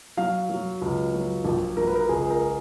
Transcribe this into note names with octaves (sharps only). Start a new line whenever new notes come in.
F#3 F5
F#3
C#2
F#3
A#1
A#1 A#4
B4
A#4
C#2 G#4
A#4